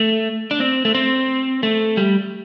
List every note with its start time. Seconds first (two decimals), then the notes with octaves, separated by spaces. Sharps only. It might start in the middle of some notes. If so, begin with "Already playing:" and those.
Already playing: A3
0.51 D4
0.60 C4
0.85 A3
0.95 C4
1.63 A3
1.97 G3